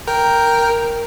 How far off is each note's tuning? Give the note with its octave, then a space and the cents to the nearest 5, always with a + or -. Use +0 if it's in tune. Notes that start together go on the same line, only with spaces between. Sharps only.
A#4 +0 G5 +0